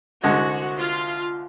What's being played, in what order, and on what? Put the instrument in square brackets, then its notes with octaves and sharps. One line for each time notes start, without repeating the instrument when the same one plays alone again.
[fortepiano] C2 D3 G#3 [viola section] F#4
[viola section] F4 F5